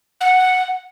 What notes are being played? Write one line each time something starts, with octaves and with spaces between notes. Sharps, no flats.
F#5